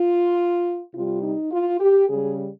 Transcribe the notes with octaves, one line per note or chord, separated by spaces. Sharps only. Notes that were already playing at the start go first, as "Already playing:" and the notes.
Already playing: F4
C3 G3 F4
D#4
F4
G4
C#3 G3 G#4